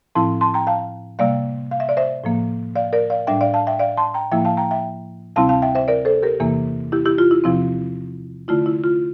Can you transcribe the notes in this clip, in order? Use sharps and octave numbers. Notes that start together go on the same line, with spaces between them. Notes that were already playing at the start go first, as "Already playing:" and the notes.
A2 F3 C4 E4 A5 C6
A5 C6
G5 A#5
F5 A5
C3 G3 A#3 D5 F5
F5
E5
D5
C5 E5
A2 F3 A#3
D5 F5
A#4 D5
D5 F5
A2 G3 D4 E5 G5
D5 F5
F5 A5
E5 G5
D5 F5
A5 C6
G5 A#5
A2 F3 A#3 E4 E5 G5
F5 A5
G5 A#5
E5 G5
D2 C3 G3 C4 E4 F5 A5
F5 A5
E5 G5
C5 E5
A#4 D5
A4 C5
G4 A#4
E2 C3 E3 A#3
E4 G4
E4 G4
F4
E4
E2 C3 F3 C4 E4
D3 A3 E4 F4
E4
F4